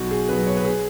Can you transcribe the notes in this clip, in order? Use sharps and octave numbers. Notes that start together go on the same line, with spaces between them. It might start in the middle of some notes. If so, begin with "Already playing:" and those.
Already playing: B1 F#4
G#4
B2 F#3 B4
C#5
B4
G#4